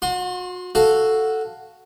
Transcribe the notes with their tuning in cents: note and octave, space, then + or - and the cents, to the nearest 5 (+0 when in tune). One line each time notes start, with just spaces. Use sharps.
F#4 -35 C6 +15
F#4 +0 A4 +0 F5 +0